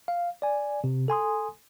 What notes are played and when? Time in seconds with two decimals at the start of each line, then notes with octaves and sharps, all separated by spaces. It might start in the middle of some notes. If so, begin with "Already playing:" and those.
0.08 F5
0.42 D5 G#5
0.84 C3
1.08 A4 G#5 C6 D#6